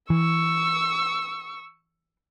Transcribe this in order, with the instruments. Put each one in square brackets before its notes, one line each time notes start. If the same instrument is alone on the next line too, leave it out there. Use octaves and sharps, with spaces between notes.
[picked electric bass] E3 [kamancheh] C#6 E6